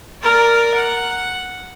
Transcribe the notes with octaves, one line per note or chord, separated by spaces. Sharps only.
A#4 D5
F#5